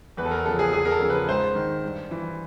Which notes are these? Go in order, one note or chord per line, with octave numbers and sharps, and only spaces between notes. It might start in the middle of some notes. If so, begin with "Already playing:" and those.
E2 B4
A4
A#4
C#3 F3 A4
G#4
E2 G#4
A#4
A4
C#3 F3
B4
G#2 C5
D#3
G2
E3